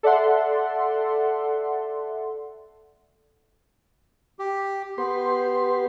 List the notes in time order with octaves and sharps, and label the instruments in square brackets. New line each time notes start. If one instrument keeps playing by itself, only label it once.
[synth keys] A4 D5 E5 F#5 C6
[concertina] G4
[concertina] B3 [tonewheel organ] G4 B4 C6